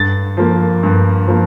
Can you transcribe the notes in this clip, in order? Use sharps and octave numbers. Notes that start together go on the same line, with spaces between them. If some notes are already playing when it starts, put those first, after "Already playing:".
Already playing: G2 A6
F3 A#3
G2
F3 A#3